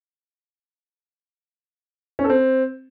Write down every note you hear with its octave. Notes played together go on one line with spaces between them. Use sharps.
C#4
A4
C4